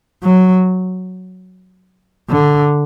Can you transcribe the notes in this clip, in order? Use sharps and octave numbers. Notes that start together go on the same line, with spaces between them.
F#3
D3